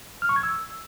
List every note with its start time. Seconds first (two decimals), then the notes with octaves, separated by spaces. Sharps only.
0.22 F6
0.29 C#6
0.36 G#6
0.43 E6